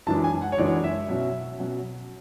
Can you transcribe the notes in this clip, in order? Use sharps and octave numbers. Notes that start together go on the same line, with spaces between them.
F#2 E3 G#3 D4 A5
G#5
F#5
C#5
F#2 E3 G#3 D4 D5
E5
B2 F#3 C#4 E5
B2 F#3 C#4